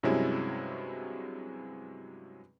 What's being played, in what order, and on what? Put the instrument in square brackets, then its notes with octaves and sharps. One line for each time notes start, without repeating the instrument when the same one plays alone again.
[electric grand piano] G2 C3 F#3 G#3 C#4 E4